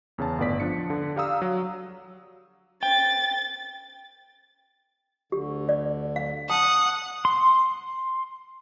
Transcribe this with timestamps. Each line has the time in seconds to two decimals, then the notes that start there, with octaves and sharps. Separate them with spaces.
0.18 E2 C#3 C#5 A5
0.38 G1 A2 B3 D5 B6
0.60 F3 D4 C#7
0.90 D3
1.16 G4 D5 F5 A#5 D#6 E6
1.42 F#3
2.83 G5 A6
5.32 D2 D3 G4
5.69 D5
6.16 F5
6.50 F#5 A5 D#6
7.25 C6